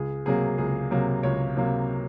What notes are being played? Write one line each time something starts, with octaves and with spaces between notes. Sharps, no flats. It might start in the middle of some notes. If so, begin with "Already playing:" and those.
Already playing: C#2 G#4
C3 F#3 A#3 G#4
C#2 G#4
C3 F#3 A#3
C#2 C#5
C3 F#3 A#3